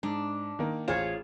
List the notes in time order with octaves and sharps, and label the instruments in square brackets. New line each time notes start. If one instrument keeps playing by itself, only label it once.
[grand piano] G#2 [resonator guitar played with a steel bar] D4
[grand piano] D#3 A#3
[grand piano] A1 C5 E7 [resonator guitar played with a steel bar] F4 G#4 C#5